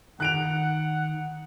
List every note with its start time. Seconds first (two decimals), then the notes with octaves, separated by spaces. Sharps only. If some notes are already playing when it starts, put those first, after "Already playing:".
0.20 D#3 F#5 F#6 D7 F7